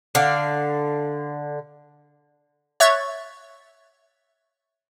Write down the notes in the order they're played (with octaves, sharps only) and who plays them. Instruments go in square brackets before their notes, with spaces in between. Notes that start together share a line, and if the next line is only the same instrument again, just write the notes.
[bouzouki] D3 D5 F5
[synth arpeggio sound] C#5 E5 C#6 F#6 G#6 A6